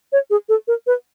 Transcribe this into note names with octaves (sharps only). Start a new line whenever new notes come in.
C#5
G#4
A4
A#4
B4